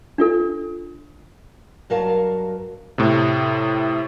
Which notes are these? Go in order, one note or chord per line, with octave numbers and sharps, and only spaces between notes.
D4 F4 A4
G2 F#3 A#4 F5 A5
A2 C3